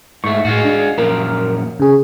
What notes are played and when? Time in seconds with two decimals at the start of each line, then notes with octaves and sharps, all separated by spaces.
0.24 G#2 A3 C#6
0.45 A2 G#3 F4 F#4
0.64 D4
0.98 F#2 A#2 F3 A#4
1.80 C#3 G#4